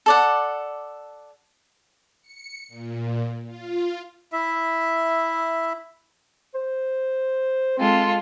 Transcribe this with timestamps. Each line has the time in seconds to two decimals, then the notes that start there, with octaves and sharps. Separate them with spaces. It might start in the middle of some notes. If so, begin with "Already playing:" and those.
0.06 A4 D5 F#5
2.22 C#7
2.68 A#2
3.45 F4
4.32 E4 E5
6.55 C5
7.78 G#3 C4 F4 A4